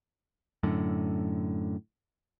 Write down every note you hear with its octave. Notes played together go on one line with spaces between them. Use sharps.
F#2 A2 D3